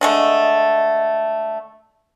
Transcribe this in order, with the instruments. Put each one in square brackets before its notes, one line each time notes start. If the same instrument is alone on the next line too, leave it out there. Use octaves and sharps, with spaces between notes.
[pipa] D3 G#3 A3